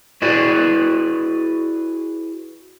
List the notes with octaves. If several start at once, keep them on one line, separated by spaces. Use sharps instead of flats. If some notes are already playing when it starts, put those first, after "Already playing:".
E4 F#4 G#4 B4 D5